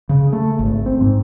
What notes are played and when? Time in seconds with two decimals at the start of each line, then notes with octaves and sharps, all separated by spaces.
0.09 C#3
0.33 A3
0.59 G#1
0.86 C4
1.01 G#2